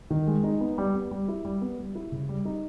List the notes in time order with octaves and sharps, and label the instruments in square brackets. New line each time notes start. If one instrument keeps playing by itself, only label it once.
[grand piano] D#3
G#3
D#4
B3
G3
B3
G3
E4
G3
B3
G3
E4
C#3
G3
D#4